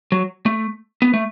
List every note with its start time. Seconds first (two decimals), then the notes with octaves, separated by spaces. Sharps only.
0.12 F#3
0.46 A3
1.02 B3
1.14 A3